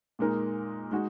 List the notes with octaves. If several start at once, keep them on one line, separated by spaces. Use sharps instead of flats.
A#2 G#3 D#4 A#4
G#3 D#4 F#4